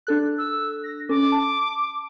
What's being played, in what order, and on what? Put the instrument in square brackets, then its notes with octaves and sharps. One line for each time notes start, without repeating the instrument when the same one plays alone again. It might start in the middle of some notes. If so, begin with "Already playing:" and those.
[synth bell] D4 A4 F#6
[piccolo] E6
A#6
[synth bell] C#4 A4 [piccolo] D6
[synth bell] A5